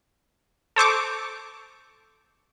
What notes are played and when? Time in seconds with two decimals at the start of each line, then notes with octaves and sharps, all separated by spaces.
0.76 A4 C5 C#6 D6